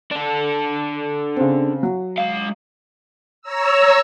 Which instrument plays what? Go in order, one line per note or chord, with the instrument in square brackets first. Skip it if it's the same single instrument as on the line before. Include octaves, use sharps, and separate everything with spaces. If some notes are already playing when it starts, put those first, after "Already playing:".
[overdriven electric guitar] D4 A4
[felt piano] C#3 C4
F#3
[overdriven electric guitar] G#3 F5
[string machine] C#5 A#5 E6